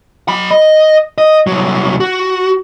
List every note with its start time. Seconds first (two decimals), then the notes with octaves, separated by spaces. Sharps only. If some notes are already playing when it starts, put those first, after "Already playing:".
0.28 F#3 B5
0.51 D#5
1.18 D#5
1.47 C2 F#3
2.00 F#4